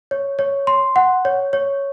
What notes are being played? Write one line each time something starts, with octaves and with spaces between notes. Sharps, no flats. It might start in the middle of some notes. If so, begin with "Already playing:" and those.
C#5
C#5
C6
F#5
C#5
C#5